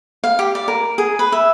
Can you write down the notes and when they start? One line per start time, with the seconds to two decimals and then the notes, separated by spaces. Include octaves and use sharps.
0.24 F5
0.39 G4
0.55 D5
0.68 A#4
0.98 G#4
1.19 B4
1.32 E5